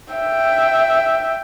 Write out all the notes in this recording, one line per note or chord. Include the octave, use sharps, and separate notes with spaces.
E5 G5